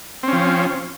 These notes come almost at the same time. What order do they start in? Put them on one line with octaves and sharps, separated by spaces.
C4 C#4 F3